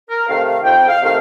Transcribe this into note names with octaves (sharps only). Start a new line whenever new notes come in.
A#4
C3 D#3 A3 F5
F5
F2 G5
F5
C3 D#3 A3 F5